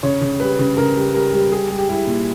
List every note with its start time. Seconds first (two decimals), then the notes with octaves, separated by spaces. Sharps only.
0.03 C#3 C#5
0.21 C#3
0.40 G3 B4
0.59 C#3
0.77 C#3 A#4
0.96 G3
1.14 G3 A#4
1.33 G3
1.51 G3 G#4
1.70 G3
1.79 G4
1.88 G3 E4
2.07 A#2